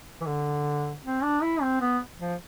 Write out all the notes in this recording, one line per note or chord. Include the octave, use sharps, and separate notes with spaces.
E3
D3
C4
D4
E4
C4
B3
F3